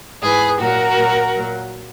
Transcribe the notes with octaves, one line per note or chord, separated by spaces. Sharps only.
G#2 E3 G#4 B4
A#2 F#3 F#4 A#4
A#2 F#3
A#2 F#3